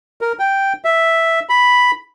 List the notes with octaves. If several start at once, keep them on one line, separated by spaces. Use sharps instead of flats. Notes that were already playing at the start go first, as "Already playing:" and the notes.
A#4
G5
E5
B5